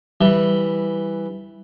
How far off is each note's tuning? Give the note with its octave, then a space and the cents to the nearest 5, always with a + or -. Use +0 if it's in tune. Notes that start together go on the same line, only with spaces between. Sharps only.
E3 +0 G3 +0